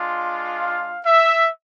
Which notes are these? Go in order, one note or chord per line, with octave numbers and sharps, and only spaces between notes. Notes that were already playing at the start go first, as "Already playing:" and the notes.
Already playing: G#3 D4 F4
F5
E5